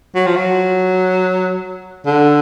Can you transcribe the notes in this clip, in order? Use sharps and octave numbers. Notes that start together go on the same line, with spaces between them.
F#3
F3
F#3
D3